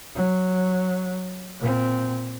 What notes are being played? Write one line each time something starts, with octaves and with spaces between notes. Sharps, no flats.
F#3
A#2 C4